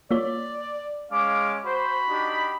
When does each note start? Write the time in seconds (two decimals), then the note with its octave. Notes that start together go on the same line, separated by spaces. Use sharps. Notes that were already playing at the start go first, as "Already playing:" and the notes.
0.11 A#3 F4 C#5 D5
1.11 G#3 C#4 F5 D6
1.65 F#4 C5 B5
2.10 D4 D#4 G4